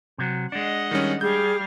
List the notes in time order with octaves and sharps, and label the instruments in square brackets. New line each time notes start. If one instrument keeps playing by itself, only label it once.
[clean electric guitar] C3 F#3
[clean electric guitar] G#3 D4 [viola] D#5 F#5
[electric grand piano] D#3 G3 C#4
[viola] G3 F5 [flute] G#4 [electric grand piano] G6